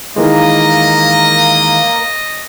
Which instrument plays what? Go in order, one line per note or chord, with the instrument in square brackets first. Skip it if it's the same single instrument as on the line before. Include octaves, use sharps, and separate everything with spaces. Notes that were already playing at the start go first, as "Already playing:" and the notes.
[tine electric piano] D#3 E3 G#3 [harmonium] A#3 [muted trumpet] D#5